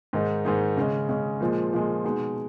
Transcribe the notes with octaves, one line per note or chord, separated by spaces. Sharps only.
G#2 D#3 G#3 D#4
G#2 D#3 G#3 D#4
C#3 G#3 C#4
C#3 G#3 C#4
A#2 F3 G#3
A#2 F3 G#3
B2 G#3 D#4 F#4